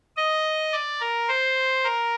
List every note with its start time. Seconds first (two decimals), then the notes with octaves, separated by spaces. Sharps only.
0.16 D#5
0.72 D5
1.01 A#4
1.29 C5
1.84 A#4